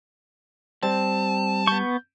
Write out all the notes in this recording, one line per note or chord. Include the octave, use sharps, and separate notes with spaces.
G3 C4 A5
B3 C#6 G6